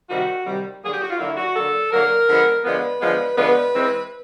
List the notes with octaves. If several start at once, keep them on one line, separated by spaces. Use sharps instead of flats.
C3 D#3 G3 F#4
C3 D#3 G3
D3 F#3 A#3 G#4
G4
F#4
F4
D3 F#3 A#3 E4
F#4
D3 F#3 A#3 A4
D3 F#3 A#3 A#4
D3 F3 G#3 B3
D3 F3 G#3 B3 B4
D3 F3 G#3 B3
D3 F3 G#3 B3 B4
E3 G#3 C4